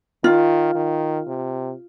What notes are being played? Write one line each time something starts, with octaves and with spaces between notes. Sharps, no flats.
D#3 F4
D#3
C3